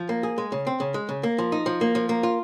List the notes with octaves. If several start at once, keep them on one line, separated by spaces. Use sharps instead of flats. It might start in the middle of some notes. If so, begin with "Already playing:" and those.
Already playing: F3
A#3
G#4
G#3
C#3
C4
C#3
G#3
C#3
A#3
F3
D#4
F3
A#3
F3
A#3
F4